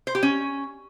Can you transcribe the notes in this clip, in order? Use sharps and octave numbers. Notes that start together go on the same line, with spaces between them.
C5
G4
C#4